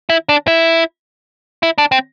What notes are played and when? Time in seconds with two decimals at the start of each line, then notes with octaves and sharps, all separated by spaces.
0.09 E4
0.29 D4
0.48 E4
1.63 E4
1.78 D4
1.92 C4